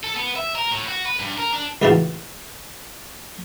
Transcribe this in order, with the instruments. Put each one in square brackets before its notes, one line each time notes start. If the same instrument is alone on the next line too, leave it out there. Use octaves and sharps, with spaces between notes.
[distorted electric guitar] A4
B3
E5
A#4
A2
F#4
B4
G2
A#4
D4
[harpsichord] C#2 A2 C#3 E3 F#4 A5